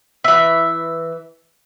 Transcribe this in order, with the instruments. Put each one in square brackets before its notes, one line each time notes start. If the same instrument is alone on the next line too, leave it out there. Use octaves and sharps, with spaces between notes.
[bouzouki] E3 E5